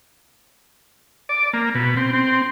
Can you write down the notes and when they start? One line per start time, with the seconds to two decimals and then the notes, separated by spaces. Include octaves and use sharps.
1.29 D5
1.53 A#3
1.75 B2
1.97 C4
2.13 C4